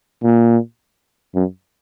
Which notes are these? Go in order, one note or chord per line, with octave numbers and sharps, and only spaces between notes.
A#2
F#2